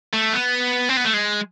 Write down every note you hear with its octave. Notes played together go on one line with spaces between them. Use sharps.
A3
B3
C4
B3
A3
G#3